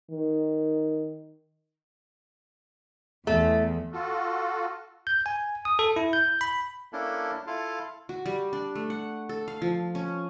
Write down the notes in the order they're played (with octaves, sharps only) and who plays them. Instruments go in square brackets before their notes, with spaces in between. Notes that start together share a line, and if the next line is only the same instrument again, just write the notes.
[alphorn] D#3
[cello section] E2 [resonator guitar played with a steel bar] A3
[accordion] F4 F#4 A4
[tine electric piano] G6
G#5
D#6
A4
E4
G6
B5
[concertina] A#3 C#4 D4 E4 A4
E4 F4 A4 F5
[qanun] F#4
G3
D4
A3
F#5
A4
F5
F3
C#4